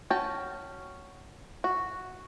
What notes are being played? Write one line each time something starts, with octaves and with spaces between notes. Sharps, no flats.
C#4 F#4 G5 A5
F#4